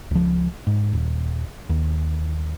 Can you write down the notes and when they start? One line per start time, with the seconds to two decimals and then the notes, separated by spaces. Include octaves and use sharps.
0.11 C#2 F3
0.67 G#2
0.93 D#1
1.69 D#2